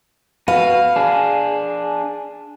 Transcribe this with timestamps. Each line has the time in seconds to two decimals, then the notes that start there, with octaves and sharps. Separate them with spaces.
0.48 F#4 B4 F5
0.96 D4 G#4